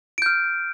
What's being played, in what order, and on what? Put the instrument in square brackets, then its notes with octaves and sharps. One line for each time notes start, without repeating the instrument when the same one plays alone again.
[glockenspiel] D7
G6
F6